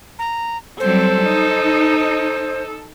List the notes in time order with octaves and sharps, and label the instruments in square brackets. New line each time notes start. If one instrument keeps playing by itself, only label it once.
[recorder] A#5
[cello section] F#3 G3 C4 [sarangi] A4 [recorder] C5
[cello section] D#4
[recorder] C5